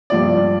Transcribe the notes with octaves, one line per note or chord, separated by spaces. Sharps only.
G2 F3 D5